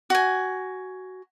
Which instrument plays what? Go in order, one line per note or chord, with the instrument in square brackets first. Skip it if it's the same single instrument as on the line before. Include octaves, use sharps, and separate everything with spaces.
[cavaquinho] F#4 G#5